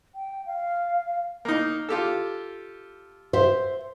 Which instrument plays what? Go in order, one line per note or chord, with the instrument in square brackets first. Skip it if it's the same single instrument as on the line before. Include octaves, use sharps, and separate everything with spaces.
[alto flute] G5
F5
[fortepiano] A#3 D#4
F4 G4 A4
[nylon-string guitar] C5 E5